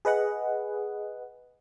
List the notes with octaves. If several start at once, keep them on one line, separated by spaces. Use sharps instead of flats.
G#4 B4 D#5 F#5